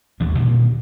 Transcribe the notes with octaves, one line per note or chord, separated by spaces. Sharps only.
A1 D#2 E3 G3
A#2 D3 D#3 A#3